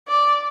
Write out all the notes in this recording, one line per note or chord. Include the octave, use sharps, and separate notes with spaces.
D5